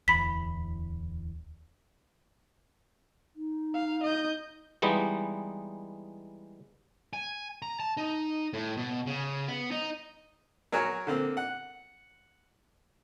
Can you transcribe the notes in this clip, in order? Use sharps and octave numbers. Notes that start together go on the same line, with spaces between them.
D1 E2 B5 B6
D#4
F5
D#5 G6
E3 G3 G#3 B3 D#4
G#5
A#5
A5
D#4
A2
B2
C#3
B3
D#4
F#3 G#4 A#4 C#5
D3 A#3 C4
F#5